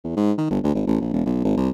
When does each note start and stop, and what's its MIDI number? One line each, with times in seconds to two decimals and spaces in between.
0.04 0.12 40
0.17 0.32 44
0.38 0.49 51
0.50 0.59 31
0.64 0.72 38
0.75 0.85 32
0.87 0.97 33
1.01 1.12 34
1.13 1.25 28
1.25 1.40 35
1.45 1.53 32
1.57 1.70 36